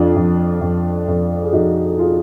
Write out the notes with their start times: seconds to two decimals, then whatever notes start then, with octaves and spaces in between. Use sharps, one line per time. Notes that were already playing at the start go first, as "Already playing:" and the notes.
Already playing: F2 D4 F4
0.16 F2
0.61 F2
1.08 F2
1.43 G#4
1.53 F2 D#4 F#4
1.99 F4 G#4